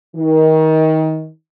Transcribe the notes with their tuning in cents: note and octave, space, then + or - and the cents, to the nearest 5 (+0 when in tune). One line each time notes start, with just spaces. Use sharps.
D#3 +25